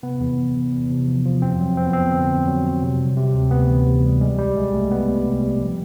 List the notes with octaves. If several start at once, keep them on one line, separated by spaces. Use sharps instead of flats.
C3 B3
E2
E2
E2
E2
C3
F3
F3
F2 C4
F#3
F2 C4
B3
F2 C4
D3 C4
F2
F#3
F#3
C3
G3
C3
D2
D2 B3
E3
C3
G3
G3 G#3
C2 G3
B2 G#3
C2 A3
C2 B3
G3
C2
G3
F3